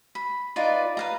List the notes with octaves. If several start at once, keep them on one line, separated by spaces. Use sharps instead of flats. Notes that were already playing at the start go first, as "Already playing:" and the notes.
B5
D#4 F4 B4 D5
B4 F5 A#5